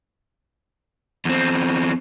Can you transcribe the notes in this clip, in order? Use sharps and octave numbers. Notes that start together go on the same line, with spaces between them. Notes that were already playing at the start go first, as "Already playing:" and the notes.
E2 C4